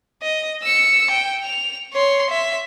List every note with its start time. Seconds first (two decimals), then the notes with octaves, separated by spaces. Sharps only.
0.22 D#5
0.63 E6 C#7
1.11 G5
1.43 F7
1.93 C#5 C6
2.30 E5